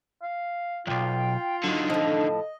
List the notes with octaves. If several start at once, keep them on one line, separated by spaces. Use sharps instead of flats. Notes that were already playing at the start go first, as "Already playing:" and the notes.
F5
B1 E2 F4 G5
D3 D#3 F#3
A2 F3 D#5